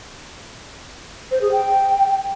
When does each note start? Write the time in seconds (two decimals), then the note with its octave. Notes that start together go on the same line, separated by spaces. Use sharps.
1.31 C5
1.41 G#4
1.52 G5